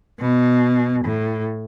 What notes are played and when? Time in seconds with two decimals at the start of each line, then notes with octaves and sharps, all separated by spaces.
0.20 B2
1.05 A2